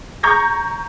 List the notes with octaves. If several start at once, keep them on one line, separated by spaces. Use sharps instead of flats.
A#5 C#6 G6 G#6 A#6